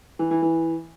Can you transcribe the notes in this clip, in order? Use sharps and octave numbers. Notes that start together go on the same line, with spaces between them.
E3
E3
E3